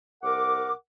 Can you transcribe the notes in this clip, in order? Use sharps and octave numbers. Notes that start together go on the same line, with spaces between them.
C2 A#4 F#5 D6